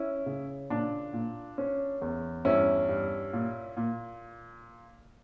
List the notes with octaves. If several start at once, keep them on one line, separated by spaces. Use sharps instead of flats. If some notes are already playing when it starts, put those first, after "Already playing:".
Already playing: C#4 E4
C#3
A#2 D4
A#2
C#4
E2
G2 C#4 E4
G2
A#2
A#2